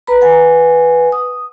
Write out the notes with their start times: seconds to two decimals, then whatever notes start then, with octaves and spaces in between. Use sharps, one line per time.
0.07 B4 A#5 B5
0.21 B4 F#5 G#5
1.12 D#6